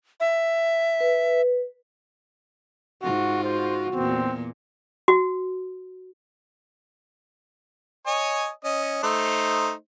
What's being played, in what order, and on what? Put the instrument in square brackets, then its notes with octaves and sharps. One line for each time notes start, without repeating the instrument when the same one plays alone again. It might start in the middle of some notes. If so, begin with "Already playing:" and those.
[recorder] E5
[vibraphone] B4
[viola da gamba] G#2 F4 [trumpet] F#4
[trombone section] F#4 [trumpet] C5
[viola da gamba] E2 A#2 [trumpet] C4
[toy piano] F#4
[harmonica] C#5 D#5 G#5
C#4 D#5
A3 D#4 C5